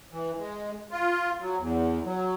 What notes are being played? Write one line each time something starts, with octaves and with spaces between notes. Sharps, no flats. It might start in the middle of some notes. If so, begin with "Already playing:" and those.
E3
G#3
F4
F#3
E2
F#3